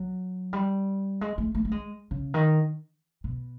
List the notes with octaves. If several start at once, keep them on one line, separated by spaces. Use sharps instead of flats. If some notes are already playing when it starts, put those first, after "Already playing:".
Already playing: F#3
G3
G#3
A3
A3
A3
G#3
C#3
D#3
B2